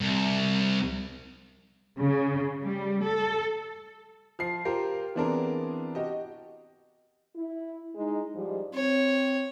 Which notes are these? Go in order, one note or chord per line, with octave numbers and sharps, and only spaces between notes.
C2
C#3
G3
A4
F3 C7
F4 G4 A#4 C5
E3 B3 C4 D4 G#4 A#4
F#4 G4 D#5
E4
G#3 D#4
G#2 F3 G3
C4 C#5